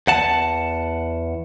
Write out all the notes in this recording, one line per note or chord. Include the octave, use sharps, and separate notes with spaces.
E2 F#5 A5